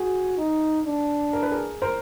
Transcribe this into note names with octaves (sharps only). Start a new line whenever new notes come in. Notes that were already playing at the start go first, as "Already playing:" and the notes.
Already playing: F#4 G#4
D#4
D4
A#4
B4
G#4 A#4
A#4 C5